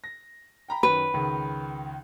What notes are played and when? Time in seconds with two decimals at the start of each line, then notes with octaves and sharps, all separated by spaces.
0.04 A#6
0.68 G5 A#5 B5
0.83 F#2 D#3 B4
1.14 C#2 D#3